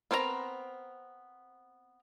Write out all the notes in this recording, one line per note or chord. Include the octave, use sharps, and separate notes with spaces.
B3 C4 A#4 C#5 A#5